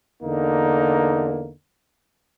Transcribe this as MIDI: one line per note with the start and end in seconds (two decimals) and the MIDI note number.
0.23 1.51 40
0.23 1.51 50
0.23 1.51 58
0.23 1.51 63